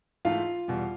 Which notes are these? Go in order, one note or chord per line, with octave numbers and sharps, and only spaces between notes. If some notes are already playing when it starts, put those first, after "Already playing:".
G#2 E3 A3 F4 F5
E2 B2 G3